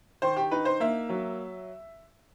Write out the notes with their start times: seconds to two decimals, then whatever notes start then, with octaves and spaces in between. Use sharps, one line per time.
0.22 D#3 C5
0.36 G4
0.51 D#4 B4
0.65 C5
0.80 A#3 E5
1.09 F#3